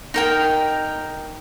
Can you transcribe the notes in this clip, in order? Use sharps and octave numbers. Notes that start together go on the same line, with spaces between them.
D#4 A#4 G5